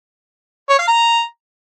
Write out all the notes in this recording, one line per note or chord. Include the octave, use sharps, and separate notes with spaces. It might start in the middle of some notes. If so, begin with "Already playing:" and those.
C#5
F5
A#5